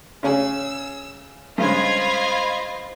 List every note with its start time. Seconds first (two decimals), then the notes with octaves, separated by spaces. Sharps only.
0.23 C#3 C#4 G#4 E6
1.58 G2 C#3 G#3 F4 C5 D#5 B5 G#6